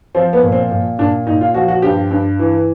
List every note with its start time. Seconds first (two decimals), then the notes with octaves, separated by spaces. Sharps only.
0.15 F3 C4
0.33 B3
0.43 A#2
0.52 C4
0.71 A#2
0.99 A#2 D4
1.27 A#2 D#4
1.41 F4
1.54 F3 F#4
1.68 F#4
1.82 G2 G4
2.11 G2
2.39 E3